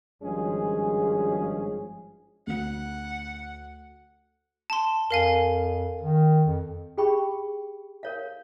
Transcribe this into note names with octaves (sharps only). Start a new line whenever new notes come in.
G#1 G2 F3 G#3 C#4 G#4
D2 F#5
A5 C6
F2 A#4 F5 G#5
D#3
F2
G4 G#4 G5 B5 C#6
A#4 C#5 F5